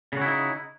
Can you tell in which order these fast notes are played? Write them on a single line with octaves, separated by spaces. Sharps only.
C#3 F#4 E4 D#4